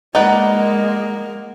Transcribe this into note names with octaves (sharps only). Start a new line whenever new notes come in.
G#3 A#3 D#4 B4 D5 F#5